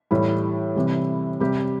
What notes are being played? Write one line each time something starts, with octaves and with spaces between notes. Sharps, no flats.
A2 E3 G3 E4
C3 E3 G3
C3 G3 G4